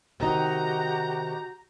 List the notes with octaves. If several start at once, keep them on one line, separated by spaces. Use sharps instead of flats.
C3 D#3 D#4 F#4 G4 A#5 G6